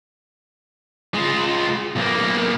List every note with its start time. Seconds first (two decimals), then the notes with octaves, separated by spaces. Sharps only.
1.14 G#3 F4
1.96 B1 A#3